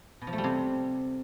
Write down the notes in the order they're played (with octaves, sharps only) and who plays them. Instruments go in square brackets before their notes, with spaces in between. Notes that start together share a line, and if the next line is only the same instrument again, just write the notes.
[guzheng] B2
F3
A3
G3
C3